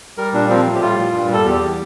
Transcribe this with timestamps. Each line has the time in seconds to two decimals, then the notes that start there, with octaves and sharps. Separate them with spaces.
0.17 G3 A#4
0.33 A#2 D4
0.50 F3 C4
0.65 A2
0.75 G4
0.82 G3 F4
0.98 A#2
1.13 G2
1.30 G3 A4
1.45 E2 G4
1.62 G3